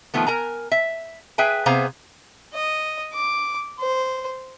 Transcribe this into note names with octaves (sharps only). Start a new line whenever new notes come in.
D#3 F3 A3 B3
A#4 G#5 A#5
E5
G#4 B4 E5 G5 G#5
C3 B3 G#4 C5 F5 A#5
D#5
D6
C5